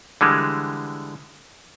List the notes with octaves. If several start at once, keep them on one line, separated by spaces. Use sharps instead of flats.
D3 E3 G3 G#3